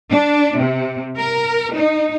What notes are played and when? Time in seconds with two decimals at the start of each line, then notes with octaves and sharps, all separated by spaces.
0.11 D4
0.57 C3
1.18 A#4
1.73 D#4